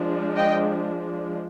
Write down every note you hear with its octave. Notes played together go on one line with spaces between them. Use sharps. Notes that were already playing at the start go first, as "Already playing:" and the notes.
Already playing: F3 G#3 D4
D#5 G5